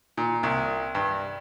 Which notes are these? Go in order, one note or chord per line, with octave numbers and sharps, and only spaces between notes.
A#2
C2
G2